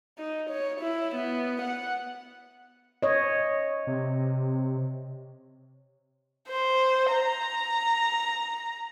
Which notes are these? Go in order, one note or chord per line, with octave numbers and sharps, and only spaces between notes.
D#4
C#5
E4
B3
F#5
C#5 D#5
C3
C5
A#5